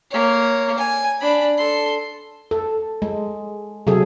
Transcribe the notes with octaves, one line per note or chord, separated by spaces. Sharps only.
A#3 C#5
G#5
D4 B5
A4 C6
A4
G#3
C3 F#3 G#4 A4